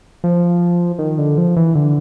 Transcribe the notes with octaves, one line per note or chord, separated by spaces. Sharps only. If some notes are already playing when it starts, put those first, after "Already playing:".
F3
D#3
D3
F3
E3
D3